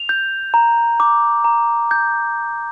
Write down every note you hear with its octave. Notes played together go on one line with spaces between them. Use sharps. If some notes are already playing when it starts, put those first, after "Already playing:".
Already playing: F7
G6
A#5
D6
A#5
G6